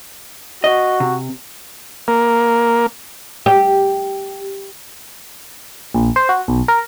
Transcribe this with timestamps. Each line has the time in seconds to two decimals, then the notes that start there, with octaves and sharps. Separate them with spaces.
0.64 F#4 D#5
1.00 C3
2.08 A#3
3.46 G4
5.94 A#1
6.16 C5
6.29 F#4
6.48 B1
6.68 A#4